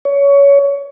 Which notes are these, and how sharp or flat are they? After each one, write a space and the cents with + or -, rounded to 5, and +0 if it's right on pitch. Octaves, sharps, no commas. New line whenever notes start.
C#5 +20